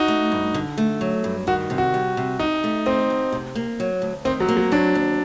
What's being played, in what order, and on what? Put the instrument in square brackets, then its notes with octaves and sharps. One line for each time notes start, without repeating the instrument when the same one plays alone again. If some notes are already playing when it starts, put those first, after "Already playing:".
Already playing: [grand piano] D#4 F#4
[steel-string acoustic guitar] A3
G2
D3
A3
F#3
G2
[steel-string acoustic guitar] D#3 [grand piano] F#4
[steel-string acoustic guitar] C3
[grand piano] F#4
[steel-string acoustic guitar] G3
C3
[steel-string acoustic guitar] C3 [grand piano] D#4
[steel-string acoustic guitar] A3
[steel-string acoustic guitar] D#3 [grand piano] C4
[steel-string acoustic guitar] D2
C3
A#3
F#3
D2
[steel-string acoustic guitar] D#3 [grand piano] C4
[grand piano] F#3
[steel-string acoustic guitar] A#3
[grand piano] F#3
[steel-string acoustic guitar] F#3 [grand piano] D4
[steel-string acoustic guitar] D#2